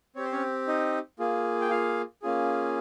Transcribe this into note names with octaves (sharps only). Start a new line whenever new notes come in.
C4 G4 C#5
C5
C#4 C#5
D#4 D#5
A#3 F4 G#4
G5
F4 F5
A#3 C#4 F4 G#4